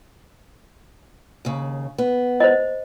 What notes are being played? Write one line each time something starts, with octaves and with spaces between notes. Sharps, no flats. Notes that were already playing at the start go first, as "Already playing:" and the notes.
D#2 C#3
B3
C5 D#5